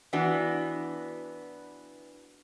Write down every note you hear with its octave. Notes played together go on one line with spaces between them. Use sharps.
E3 B3 D4 F#4